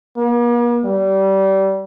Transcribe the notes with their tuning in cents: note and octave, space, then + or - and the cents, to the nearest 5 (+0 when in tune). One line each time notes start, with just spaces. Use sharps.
A#3 +45
G3 -25